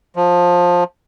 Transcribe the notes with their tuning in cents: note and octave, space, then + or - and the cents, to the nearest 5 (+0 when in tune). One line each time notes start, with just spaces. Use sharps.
F3 +15